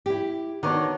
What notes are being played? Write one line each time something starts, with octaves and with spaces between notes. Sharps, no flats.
E4 G4
D#3 F#3 B3 D4 D#4 C#5